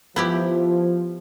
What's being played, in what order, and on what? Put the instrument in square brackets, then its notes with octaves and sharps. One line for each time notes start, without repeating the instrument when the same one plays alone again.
[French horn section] F3 [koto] B3 E4 G4